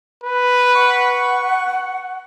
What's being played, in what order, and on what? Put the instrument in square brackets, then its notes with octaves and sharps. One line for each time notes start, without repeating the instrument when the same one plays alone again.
[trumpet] B4
[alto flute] F#5 [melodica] C#6